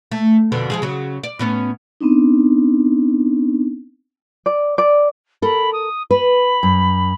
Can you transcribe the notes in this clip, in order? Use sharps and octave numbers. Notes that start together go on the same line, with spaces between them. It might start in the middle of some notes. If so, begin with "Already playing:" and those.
A3
F2 B2 D3
F3 G#3 G#4
C#3 F#3
D5
A2 B3 C#4
B3 C4 D4 D#4
D5
D5
A4 A#4 B5
D#6
B4 B5
F#2